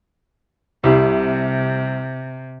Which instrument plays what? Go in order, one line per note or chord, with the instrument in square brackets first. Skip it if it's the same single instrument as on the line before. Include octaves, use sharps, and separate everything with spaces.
[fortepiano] C2 G3 [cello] C3